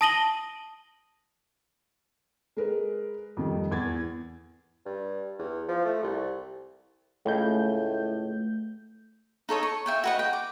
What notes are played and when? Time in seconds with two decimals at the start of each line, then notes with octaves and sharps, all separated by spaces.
0.01 A5 D#6 A#6 D#7 F#7 G7
2.57 G#3 A#4 B4
3.37 F2 D#3 G3
3.71 E2 G#6 A6
4.86 G2
5.39 E2
5.68 F3
5.85 A3
6.03 C2
7.26 C#2 A2 A3 G6
9.49 D#4 A4 C#5 D#6
9.63 C#6
9.86 E5 G5 G#5
10.04 F#4 B4 D#5
10.19 G5
10.33 D6